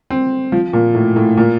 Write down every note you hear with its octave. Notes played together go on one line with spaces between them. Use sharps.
C4
F3
A#2
A2
A2
A#2